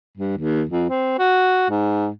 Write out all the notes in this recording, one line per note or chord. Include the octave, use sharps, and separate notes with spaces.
G2
D#2
F2
C4
F#4
G#2